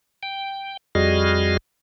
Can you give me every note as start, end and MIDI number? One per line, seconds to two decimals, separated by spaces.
0.23 0.77 79
0.95 1.57 41
0.95 1.57 55
0.95 1.57 66
0.95 1.57 68
0.95 1.57 75
0.95 1.57 89